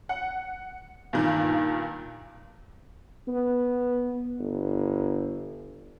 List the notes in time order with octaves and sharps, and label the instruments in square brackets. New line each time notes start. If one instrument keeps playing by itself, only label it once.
[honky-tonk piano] F#5
G2 A#2 D#3
[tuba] B3
G1